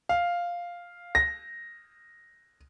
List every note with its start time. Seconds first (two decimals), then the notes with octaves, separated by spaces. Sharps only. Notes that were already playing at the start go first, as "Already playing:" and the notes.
0.09 F5
1.15 A#6